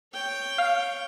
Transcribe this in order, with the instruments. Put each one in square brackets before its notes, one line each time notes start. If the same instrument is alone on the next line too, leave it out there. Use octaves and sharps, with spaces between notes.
[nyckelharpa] C#5 G5
[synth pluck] F5